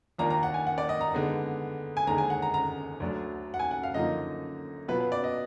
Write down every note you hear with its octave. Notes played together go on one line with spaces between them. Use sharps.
D#2 D#3 A#3 D4 F4 A#5
A#5
F#5
G#5
F#5
D5
D#5
A#5
D3 G#3 B3 D#4
G#5
D#2 D3 G#3 A#5
G#5
F#5
A#5
A#5
D2 D3 F#3 D4
F#5
G#5
F#5
F5
F#2 D3 F3 A#3 D#4 D#5
B2 F#3 B3 F4 B4
B4
D5
D#5